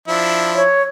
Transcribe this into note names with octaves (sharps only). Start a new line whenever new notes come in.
F3 D4 E4
C#5